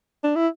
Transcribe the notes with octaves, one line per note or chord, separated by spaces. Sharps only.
D4
E4